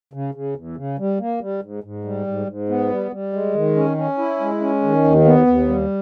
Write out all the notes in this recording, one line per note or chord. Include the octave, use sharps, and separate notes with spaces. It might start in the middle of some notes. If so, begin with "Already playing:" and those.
C#3
C#3
E2
C#3
G3
A#3
G3
G#2
G#2
G3
G#2
G#2
B3
G3
G3
G#3
D#3
C#4
C#4
E4
G#3
C#4
D#3
D#2
B3
D#2
G3